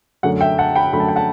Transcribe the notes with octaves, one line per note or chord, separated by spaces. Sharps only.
F#2 D3 A3 F#5
E5 G5
F#5 A5
G5 B5
F#2 D3 A3 B5
A5
G5
F#5 A5